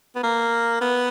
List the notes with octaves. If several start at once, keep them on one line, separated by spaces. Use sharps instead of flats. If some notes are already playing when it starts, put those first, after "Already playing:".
B3
A#3
B3